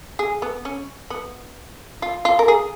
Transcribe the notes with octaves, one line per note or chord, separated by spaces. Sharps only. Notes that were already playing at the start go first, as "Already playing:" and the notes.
G#4
B3
C#4
B3
F4
F4
A#4
G#4